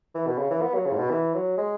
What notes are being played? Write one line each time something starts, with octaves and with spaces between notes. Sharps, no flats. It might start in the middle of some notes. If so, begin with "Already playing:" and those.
E3
B2
C#3
E3
B3
F#3
C#3
G#2
B2
E3
F#3
G#3